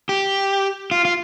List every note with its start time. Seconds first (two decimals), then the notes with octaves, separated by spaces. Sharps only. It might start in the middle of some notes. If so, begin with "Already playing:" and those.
0.09 G4
0.91 F4
1.05 F4